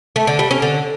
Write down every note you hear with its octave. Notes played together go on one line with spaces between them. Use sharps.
A3
D3
G3
C#4
D3